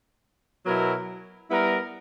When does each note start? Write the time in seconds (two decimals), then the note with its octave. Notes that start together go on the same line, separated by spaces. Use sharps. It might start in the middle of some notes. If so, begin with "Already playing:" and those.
0.66 B2 F#3 B3 E4 A#4
1.49 G3 B3 E4 A#4